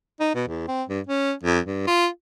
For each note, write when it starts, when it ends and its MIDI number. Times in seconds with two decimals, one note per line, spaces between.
0.20 0.30 63
0.35 0.45 47
0.48 0.64 40
0.68 0.83 60
0.89 1.00 43
1.07 1.33 61
1.43 1.59 41
1.65 1.85 43
1.87 2.08 65